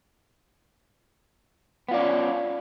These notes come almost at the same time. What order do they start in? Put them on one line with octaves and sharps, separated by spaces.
B3 F4 D5 C#4